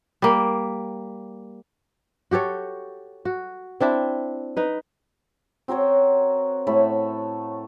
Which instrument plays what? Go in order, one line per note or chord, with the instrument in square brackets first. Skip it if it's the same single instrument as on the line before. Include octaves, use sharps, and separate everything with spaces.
[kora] G3 A#3
F#4 G4 A4 C#5
F#4
C4 D4 E4 E5
D#4 B4
[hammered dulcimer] C4 F#4 A#4 C#5
A2 A3 B5